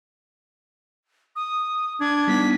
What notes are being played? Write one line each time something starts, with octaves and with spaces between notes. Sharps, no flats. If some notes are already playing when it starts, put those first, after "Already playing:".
D#6
D4 G#6
G3 B3 D#4 B6